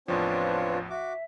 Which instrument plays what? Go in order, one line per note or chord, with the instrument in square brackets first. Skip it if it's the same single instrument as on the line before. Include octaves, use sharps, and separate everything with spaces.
[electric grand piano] A1 E2 F3 [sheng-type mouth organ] C4 D4 C#5 [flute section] F4 B4
[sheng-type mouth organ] F#4 D6 [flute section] E5